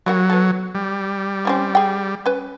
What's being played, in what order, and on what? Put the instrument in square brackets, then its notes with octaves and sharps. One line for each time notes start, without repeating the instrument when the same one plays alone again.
[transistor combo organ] F#3 [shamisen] G3 A#3 F#4
[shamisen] B3 A4
[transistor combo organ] G3
[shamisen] C4 C#4 E4
G#4 G5
C#4 B4